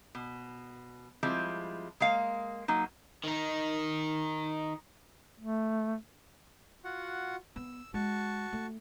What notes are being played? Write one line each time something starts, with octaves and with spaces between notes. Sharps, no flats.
B2
F3 G3 G#3 C4 E4
G#3 A#3 F5
F#3 A#3 D#4
D#3 D#4
A3
F4 F#4 F#5
B3 E6
G#3 F#4 A5 C#6
A3